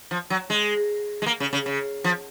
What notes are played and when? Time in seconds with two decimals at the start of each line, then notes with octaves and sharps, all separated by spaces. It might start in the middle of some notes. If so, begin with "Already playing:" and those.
0.11 F3
0.30 F#3
0.50 G#3
1.22 G#3
1.26 A#3
1.40 C#3
1.53 C#3
1.66 C#3
2.04 F3